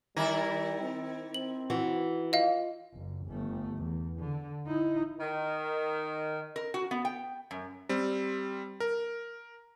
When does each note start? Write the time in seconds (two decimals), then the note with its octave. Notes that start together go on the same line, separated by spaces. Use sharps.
0.16 D#3 G3 E4 A#4
0.81 C4
1.34 C4 F#7
1.70 E3 F#4
2.33 F4 D#5 F5
2.94 F#1
3.27 G1 A3
3.77 E2
4.20 D3
4.66 D#4 E4
5.18 D#3
6.56 A#4
6.74 F#4
6.91 B3
7.05 G5
7.51 F#2
7.89 G3 C4
8.80 A#4